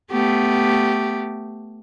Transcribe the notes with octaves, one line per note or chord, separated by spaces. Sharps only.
A3 B3 G4